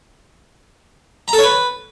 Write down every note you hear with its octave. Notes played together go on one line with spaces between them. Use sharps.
A#5
A4
C#5
B4